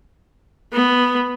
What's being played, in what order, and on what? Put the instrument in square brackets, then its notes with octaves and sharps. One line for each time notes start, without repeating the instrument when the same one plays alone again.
[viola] B3